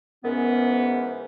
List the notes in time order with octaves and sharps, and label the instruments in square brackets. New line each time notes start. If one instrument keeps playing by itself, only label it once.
[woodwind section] G#2 E3 C#4 [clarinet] B3 [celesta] A#4